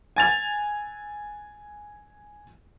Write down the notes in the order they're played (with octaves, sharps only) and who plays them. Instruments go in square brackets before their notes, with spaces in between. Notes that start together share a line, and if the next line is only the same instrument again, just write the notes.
[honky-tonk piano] G#5 A6 F7